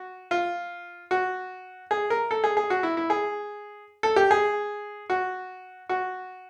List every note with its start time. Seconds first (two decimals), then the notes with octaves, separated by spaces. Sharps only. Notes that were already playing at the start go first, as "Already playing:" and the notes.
Already playing: F#4
0.31 F4
1.11 F#4
1.91 G#4
2.10 A#4
2.31 A4
2.44 G#4
2.57 G#4
2.70 F#4
2.83 E4
2.97 E4
3.10 G#4
4.03 A4
4.16 G4
4.31 G#4
5.10 F#4
5.89 F#4